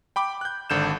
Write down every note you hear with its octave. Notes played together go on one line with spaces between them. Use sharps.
G5 B5 D6
F#6 G6
G#1 D3 G6 E7